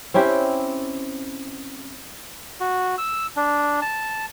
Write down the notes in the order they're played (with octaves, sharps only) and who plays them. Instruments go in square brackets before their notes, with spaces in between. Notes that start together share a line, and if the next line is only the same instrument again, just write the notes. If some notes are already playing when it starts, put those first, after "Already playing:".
[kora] C4 C#4 E4 G4
[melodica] F#4
E6
D4
A5